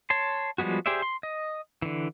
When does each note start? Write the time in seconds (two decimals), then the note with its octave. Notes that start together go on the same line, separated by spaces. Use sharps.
0.10 C#5 A5 C6
0.58 F3 G3 G#3 B3 F#4
0.86 G4 G#4 C5 D5 E5
1.02 C6
1.23 D#5
1.82 D3 E3